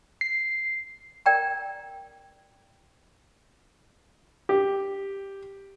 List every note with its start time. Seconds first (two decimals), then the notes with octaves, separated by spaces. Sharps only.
0.21 C7
1.26 A#4 D5 G5 A#5
4.49 G4